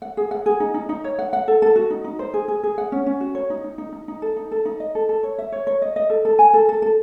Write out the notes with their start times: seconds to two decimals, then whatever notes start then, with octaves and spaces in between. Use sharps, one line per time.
0.02 F#5
0.17 G#4
0.31 F#5
0.46 G#4
0.60 D#4
0.74 D#4
0.89 D#4
1.04 C#5
1.19 F#5
1.33 F#5
1.48 A4
1.62 A4
1.76 F#4
1.90 D#4
2.04 D#4
2.19 C5
2.34 G#4
2.48 G#4
2.63 G#4
2.78 F#5
2.92 C#4
3.06 C#4
3.20 F#4
3.35 C#5
3.50 D#4
3.64 D#4
3.78 D#4
3.93 D#4
4.08 D#4
4.22 A4
4.37 D#4
4.51 A4
4.65 D#4
4.80 D#5
4.95 A4
5.09 A4
5.23 C#5
5.38 E5
5.52 C#5
5.67 C#5
5.82 D#5
5.96 D#5
6.10 A4
6.25 A4
6.39 G#5
6.54 A4
6.69 A4
6.82 A4